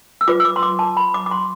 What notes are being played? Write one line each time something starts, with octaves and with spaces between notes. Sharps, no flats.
E6
F4 B4 D6
E6
D6
C6
D6
A5
B5
D6
D6
C6